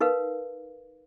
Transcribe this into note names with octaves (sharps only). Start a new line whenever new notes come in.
D#4 A#4 B4 F5